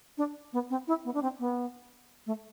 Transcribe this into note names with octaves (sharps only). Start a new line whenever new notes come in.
D4
B3
C4
E4
B3
D4
C4
B3
A3